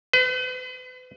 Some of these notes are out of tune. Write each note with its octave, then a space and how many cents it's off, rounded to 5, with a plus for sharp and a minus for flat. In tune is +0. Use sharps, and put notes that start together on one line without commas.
B4 +45